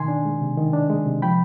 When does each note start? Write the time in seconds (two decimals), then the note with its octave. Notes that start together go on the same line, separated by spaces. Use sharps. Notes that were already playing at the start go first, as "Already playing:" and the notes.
Already playing: B2 D#3 G#5 C6
0.08 D4
0.25 G#3
0.41 C3
0.57 D#3
0.73 D4
0.90 G#3
1.06 C3
1.22 F3 G5 B5